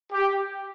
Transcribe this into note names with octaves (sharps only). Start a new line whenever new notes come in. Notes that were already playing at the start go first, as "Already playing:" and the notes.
G4